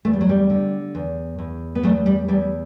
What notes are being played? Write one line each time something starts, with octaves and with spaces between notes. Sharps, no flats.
E2 A3
G3
F#3
G3
D3
E2
E2
B3
E2 F#3 A3
G3
E2 G3